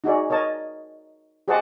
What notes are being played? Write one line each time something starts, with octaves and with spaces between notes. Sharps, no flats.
D#4 F#4 G#4 D5
A#4 C#5 D#5 A5
G4 G#4 C5 D#5 F#5 A5